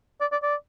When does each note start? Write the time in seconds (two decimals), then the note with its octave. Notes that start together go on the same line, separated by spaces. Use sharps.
0.21 D5
0.32 D5
0.42 D5